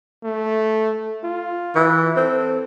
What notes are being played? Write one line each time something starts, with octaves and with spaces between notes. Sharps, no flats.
A3
F4
E3
C4 A4